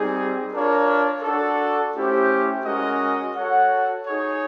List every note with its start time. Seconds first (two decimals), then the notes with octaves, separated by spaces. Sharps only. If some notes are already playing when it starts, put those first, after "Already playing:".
Already playing: G3 C4 D#4 G#4
0.52 D4 F4 A#4 C#5
1.23 D4 F#4 A4
1.95 A3 C#4 E4 G4 C5
2.64 G#3 C#4 F#4 A#4 D#5
3.36 F#4 A4 C#5 F#5
4.06 D#4 G#4 C#5